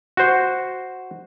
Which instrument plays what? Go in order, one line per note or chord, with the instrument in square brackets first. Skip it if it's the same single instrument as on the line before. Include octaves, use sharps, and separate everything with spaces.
[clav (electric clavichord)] F#4 C5